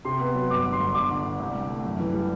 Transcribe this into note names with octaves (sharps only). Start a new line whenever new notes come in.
C3 C6
B3
F#3
G1 D6
D3
C6
G1
G1 D6
D3
D3
C2
C2
A3
F#2
E3
G3